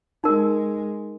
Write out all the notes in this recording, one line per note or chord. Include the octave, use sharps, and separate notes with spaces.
G#3 D#4 A#4